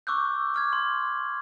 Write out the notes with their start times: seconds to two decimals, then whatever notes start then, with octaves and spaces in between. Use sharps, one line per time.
0.07 C#6 D6 E6 F#6 G6
0.54 D6 F6 G#6
0.73 C6